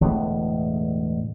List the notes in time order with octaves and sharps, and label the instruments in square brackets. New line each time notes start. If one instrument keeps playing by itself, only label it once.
[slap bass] E1 A2 D3 B3